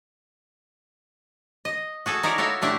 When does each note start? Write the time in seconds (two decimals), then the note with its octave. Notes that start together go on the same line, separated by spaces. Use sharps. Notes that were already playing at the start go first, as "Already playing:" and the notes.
1.65 D#5
2.06 F#4 G#4 A4
2.23 D#4 E4 A#4 C#5 D5
2.38 F#4 A4 C#5 E5 F5
2.62 A#2 A3 D4 E4 G4